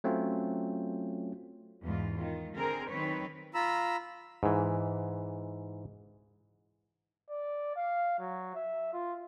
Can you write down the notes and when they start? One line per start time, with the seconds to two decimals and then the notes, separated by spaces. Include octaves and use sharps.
0.04 F#3 A3 C4 C#4 F4
1.83 E2 G#2 F4
2.17 D#3 F4
2.56 D3 C4 G#4 A#4
2.90 D#3 F#3 C4 B4 C#5
3.54 F4 A#5 B5 E6
4.43 G#2 E3
7.30 D5
7.76 F5
8.19 F#3
8.55 E5
8.93 F4